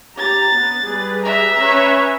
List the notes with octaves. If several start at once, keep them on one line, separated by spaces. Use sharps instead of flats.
G4 A#5 A6
B3
G3 G#4 B4
E5 A#5
C#4 B4 C#5